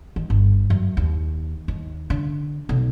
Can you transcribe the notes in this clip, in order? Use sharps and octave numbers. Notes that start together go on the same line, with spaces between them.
D#3
G1
F#2
D#2
D#2
D3
B1